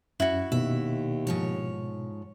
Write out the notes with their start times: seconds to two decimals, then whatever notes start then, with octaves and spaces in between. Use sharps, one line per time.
0.20 F#2 C#4 E4 F#4
0.52 D#2 B2 E5
1.27 G#2 F3 C#5